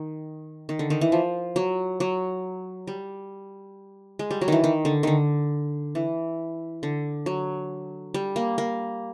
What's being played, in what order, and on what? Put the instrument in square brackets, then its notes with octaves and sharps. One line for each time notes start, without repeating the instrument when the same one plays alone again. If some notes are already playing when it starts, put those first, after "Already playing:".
Already playing: [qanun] D#3
D#3
D3
D#3
E3
F3
F#3
F#3
G3
G#3
G3
F#3
D#3 E3
D#3
D3
D3 D#3
E3
D3
F#3
G3
A#3
A#3